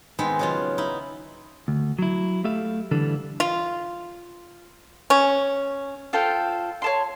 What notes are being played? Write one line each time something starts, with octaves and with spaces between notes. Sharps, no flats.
D#3 G#3 B3 C4
C#3 F#3 F4
D#4 E4
D2
F#3 E4
A3 G4 A4 E5 F5
D3 E3 G3 D4 A4
F4
C#4
F4 A4 C5 G5
C#5 A5 C6